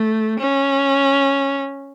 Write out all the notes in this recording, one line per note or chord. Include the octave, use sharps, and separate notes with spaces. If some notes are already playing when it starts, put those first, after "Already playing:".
Already playing: A3
C#4